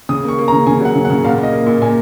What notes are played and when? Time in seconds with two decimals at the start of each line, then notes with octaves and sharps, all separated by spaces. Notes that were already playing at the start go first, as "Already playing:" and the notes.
0.09 C#3 D#6
0.24 A#3 C#6
0.38 A#3
0.48 A#5
0.53 C#3
0.67 C#3 G#5
0.81 F#3 F#5
0.96 C#3
1.05 F#5
1.10 C#3
1.24 A#2 F5
1.38 A#2 D#5
1.52 A#3
1.66 A#2
1.82 A#2 G#5